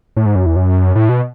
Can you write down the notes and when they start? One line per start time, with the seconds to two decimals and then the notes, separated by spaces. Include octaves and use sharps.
0.17 A2
0.26 G#2
0.35 F#2
0.46 E2
0.56 F#2
0.96 A2
1.09 B2